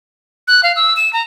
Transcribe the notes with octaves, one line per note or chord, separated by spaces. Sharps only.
F#6
F5
E6
E7
A#5